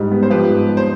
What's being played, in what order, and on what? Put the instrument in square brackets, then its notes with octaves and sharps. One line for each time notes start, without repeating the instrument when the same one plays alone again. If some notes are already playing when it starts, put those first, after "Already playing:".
Already playing: [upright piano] G#2 G3
B3
[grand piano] C5
[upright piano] F3 [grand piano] G4 B4
[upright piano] G#2
B3
[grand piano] C5